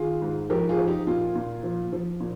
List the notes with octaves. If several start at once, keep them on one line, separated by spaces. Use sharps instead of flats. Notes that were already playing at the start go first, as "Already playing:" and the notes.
Already playing: D#3 F4 G#4
G#2
F3 G4 A#4
F4 G#4
F3
D#4 G4
A#2 F4
A#2
F3
F3
A#2